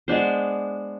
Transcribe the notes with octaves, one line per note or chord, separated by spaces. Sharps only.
G#3 B3 D4 C5